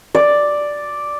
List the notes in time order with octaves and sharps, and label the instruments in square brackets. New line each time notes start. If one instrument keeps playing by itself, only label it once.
[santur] D5